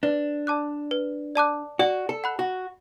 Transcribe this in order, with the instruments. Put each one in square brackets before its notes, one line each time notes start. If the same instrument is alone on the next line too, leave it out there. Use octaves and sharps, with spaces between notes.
[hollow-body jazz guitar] D4 [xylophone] B4
[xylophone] D5 A5 D6 F#6
B4
D5 A5 D6 F#6
[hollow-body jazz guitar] F#4 [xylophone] D5
[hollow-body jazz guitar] A4
[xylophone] F#5 B5 F#6
[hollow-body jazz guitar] F#4